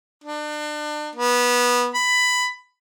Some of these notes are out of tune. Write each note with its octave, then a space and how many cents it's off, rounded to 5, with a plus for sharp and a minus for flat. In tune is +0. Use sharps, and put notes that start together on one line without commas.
D4 +35
B3 -15
B5 +10